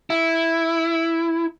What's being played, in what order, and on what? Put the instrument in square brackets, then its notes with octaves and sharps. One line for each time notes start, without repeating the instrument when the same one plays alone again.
[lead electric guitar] E4